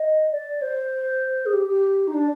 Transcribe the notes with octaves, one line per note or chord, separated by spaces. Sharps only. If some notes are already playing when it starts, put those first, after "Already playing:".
Already playing: D#5
D5
C5
G#4
G4
G4
D#4
D4